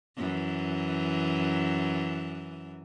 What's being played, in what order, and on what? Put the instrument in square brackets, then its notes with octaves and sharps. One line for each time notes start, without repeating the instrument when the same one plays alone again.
[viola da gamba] F#2 E3